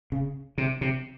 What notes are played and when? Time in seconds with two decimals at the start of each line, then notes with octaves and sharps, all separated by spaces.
0.12 C#3
0.58 C3
0.81 C3